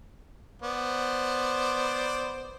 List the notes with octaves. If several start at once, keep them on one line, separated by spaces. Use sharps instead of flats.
B3 C5 D5